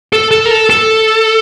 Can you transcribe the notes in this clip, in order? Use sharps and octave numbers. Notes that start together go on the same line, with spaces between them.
A4
A4
A#4
A4
A4